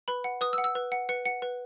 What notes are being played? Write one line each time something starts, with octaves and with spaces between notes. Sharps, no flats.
B4 B5
F#5
B4 D#6
E6
F#5
E6
B4
F#5
B4 C#7
F#5 C#7
B4